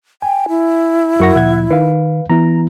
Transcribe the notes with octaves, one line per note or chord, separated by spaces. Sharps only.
G5 G#5
E4
F#2 F#4 A#4 F#5 C#6 A#6
D2 A#2 F3 E5 F#5 G#6
D#3 B4 F5
E3 B3 E4 A#5